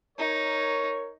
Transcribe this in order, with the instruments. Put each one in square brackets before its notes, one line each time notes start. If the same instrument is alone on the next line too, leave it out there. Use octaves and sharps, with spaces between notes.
[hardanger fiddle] D#4 [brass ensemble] A#4 C#5